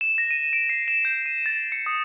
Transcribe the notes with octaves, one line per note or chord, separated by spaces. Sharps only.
E7
A#6
D#7
D7
C7
E7
G6
D#7
A6
C#7
D#6